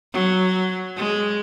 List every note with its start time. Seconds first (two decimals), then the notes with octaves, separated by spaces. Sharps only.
0.13 F#3
0.97 G#3